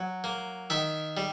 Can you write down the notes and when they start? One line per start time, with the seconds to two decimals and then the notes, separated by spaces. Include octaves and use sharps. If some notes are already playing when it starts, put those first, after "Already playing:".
Already playing: F#3
0.24 A#3
0.70 D#3 E5
1.17 G3